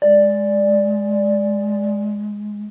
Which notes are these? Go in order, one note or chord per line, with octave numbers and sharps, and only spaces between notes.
G#3 D5